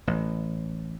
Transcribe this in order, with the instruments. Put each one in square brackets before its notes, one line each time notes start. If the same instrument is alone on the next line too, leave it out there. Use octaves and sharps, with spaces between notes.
[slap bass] A1